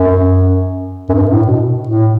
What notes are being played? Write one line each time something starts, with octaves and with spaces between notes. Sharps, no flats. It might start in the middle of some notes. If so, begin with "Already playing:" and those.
Already playing: F#2
F#2
G2
A2
B2
A2